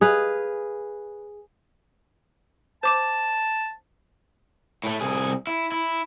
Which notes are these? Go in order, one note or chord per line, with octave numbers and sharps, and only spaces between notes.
G#4 B4 F5
C5 A5 D6 E7
A2 A3
C2 G#4
E4
E4